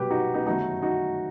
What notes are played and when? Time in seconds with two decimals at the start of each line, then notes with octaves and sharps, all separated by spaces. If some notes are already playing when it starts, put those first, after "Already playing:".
Already playing: C2 B2 F#3 G4 B4
0.11 D#4 F#4
0.34 B3 D#4
0.47 G1 F#2 D#3 A3 D#4 F#4
0.82 D#4 F#4